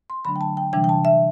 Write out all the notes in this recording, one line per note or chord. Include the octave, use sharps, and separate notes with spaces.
C6
D3 F#3 A3 D4 B5
G5
A5
G5
C3 E3 G3 D4 G5
G5
A5
E5